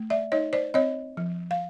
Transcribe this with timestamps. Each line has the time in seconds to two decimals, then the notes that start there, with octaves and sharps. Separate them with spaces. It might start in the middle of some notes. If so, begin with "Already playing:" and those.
Already playing: A3
0.10 D5 E5
0.32 D#4 C#5 D#5
0.53 C5 D5
0.74 C4 C#5 D#5
1.17 F3
1.51 F5